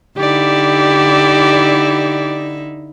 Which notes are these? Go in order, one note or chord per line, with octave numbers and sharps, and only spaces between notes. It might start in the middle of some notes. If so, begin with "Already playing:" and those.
D3 D#4 E4 G4 D5